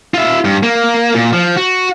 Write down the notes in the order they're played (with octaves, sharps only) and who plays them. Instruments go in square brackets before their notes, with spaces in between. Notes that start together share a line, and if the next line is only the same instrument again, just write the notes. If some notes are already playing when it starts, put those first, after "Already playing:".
[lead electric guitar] F4 E5
G2
A#3
A#2
F3
F#4